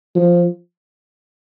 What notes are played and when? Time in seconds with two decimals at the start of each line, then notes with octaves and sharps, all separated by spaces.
0.15 F3